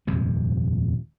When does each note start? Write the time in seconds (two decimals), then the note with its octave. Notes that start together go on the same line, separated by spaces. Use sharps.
0.07 D#1 F2 C3 G#3